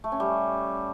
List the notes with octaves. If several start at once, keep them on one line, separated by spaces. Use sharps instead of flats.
A3
C#4
G3